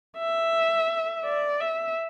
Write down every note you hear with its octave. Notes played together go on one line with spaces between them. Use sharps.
E5
D5
E5